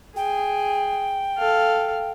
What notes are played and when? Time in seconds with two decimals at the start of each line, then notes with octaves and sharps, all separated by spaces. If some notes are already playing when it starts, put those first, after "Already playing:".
0.16 G#4 G5
1.38 A4 F5